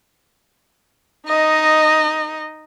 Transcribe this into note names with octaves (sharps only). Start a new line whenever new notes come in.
D#4 D#5